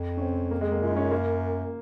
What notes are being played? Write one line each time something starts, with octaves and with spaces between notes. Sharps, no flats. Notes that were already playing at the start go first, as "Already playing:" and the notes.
Already playing: F2
C#4
C4
A#3
G#3
A#3
F#2 F4
D#4
C#4
A#3